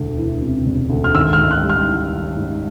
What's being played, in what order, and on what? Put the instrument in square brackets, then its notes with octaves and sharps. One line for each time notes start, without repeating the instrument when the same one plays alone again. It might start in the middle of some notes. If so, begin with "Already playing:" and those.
Already playing: [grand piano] E1 D2
E3
C3
E1
D2
F6
G#1 E6
F6
G#2
F#6
G3
F6
E3
G#1
G#2